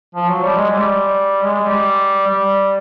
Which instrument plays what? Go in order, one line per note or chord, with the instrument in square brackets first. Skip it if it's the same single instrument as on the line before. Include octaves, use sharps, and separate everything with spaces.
[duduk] F3
F#3
G3
G#3
G3
G#3
G3
G3